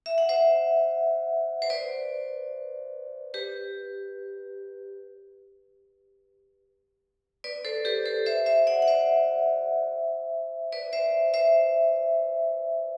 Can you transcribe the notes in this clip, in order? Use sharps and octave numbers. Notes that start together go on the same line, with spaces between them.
E5
F#5
C5 E5
C5
B4 D5
G4 B4
B4 D5
A4 C5
G4 B4
A4 C5
C5 E5
C5 E5
D5 F#5
F#5
C5 E5
B4 D5
C5 E5
C5 E5